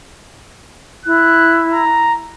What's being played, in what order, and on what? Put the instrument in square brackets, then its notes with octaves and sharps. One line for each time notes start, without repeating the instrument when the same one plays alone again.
[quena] E4 [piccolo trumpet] F#6
[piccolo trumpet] A#5